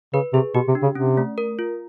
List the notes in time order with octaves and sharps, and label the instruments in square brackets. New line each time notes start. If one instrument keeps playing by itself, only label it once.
[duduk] C#3 [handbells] B4
[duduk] C3 [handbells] G#4
[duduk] B2 [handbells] G4
[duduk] C3
[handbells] D4
[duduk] C#3
[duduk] C3 [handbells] C#4
[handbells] A3
A#4
F4